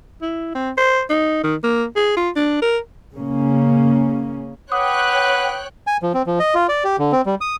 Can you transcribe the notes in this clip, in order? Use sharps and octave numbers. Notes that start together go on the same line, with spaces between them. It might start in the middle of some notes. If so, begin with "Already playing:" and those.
E4
C4
C5
D#4
D#3
A#3
G#4
F4
D4
A#4
C#3 A#3 C#4
B4 C#5 F#5 G5 D6 D#6 F#6
G#5
F3
C4
F3
D#5
F4
D5
G4
D3
C4
G3
D#6